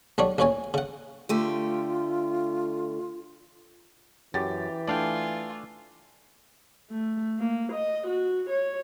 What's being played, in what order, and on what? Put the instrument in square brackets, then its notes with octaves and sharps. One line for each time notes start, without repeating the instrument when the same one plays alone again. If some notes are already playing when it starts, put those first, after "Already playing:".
[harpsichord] B1 G3 D4 C#5
A1 D2 A#2 C#4 C#5 G#5
C#3 F#5
[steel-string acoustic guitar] D3 A3 G4 [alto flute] F4
[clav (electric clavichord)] F#2 [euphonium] E3 [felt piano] G4 A6
[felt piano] A3 D4 [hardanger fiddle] F4 G#5 [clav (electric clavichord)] D5 F5 G5
[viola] A3
A#3
D#5
F#4
C#5